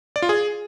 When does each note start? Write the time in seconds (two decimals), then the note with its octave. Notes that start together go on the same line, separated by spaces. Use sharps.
0.16 D5
0.22 F4
0.29 G#4